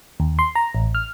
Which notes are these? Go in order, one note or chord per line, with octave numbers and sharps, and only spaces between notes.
D#2
C6
A#5
A1
F6